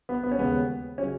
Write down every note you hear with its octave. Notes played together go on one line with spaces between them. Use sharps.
B3
B3
C#4
D#2 C#3 G#3 B3
C#3 F#3 C#4